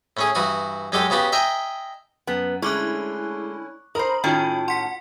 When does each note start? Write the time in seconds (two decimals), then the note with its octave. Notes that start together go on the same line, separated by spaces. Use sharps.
0.17 A2 C#4 G#4
0.35 G2 E3 F#4 D#6
0.92 F#2 G#3 G4 A4 D#5
1.10 C#3 B3 F#4 G4
1.32 D#5 E5 G5 G#5 A#5
2.27 F#2 B3
2.62 D3 G#3 A3 C#4 E4 C#6 D6 F#6
3.95 A#4 C5 D#5 A#5 B5
4.24 A2 D#3 C#4 F4 F#4 G5
4.68 F#5 C6 B6